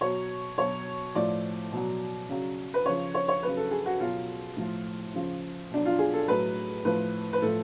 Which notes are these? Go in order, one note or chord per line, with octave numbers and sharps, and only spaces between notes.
B2 F#3 C#5
B2 F#3 C#5
A2 F3 D5
B2 F#3
C#3 F#3
B4
C#3 F3 C#5
C#5
C#5
C#3 F#3 B4
A4
G#4
F#4
B2 F#3 F4
A2 F3
C#3 F3
B2 F#3 D4
F4
G#4
A4
A2 F#3 B4
A2 F3 B4
B4
A2 F3 A4